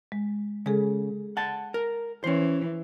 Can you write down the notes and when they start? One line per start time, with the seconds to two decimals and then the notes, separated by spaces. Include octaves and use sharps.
0.12 G#3
0.66 C#3 G#3 G#4 A4
1.37 F#5 A5
1.74 A#4
2.24 E3 C#4 C5